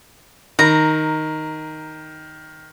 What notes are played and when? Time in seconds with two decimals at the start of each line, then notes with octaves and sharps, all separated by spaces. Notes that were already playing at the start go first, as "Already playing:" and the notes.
0.59 D#3 A#5